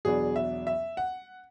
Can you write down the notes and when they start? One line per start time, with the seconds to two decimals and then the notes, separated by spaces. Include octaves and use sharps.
0.05 E2 B2 F#3 B3 D4 G#4
0.36 E5
0.67 E5
0.97 F#5